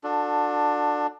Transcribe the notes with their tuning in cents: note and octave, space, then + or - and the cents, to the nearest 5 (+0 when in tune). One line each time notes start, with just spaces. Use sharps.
D4 +15 F#4 -35 A4 +5